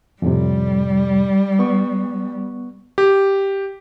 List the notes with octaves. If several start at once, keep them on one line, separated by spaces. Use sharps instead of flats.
F2 A2 C3 G3
B3 C#6
G4